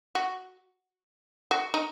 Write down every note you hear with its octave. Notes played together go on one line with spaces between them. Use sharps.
F#4
F#4
D#4